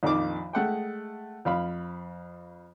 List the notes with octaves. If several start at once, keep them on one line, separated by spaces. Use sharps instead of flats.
A#1 F2 D#3 F5 D6
G#3 A3 F#5 G5
F2 F5 B5